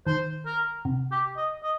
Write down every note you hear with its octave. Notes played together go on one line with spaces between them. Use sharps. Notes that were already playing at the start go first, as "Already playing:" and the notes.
D#3 C5
A#4
C3
G4
D#5
D#5